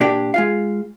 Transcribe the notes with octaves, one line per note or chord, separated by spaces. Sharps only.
A#2 D4 G4
G#3 F4 F5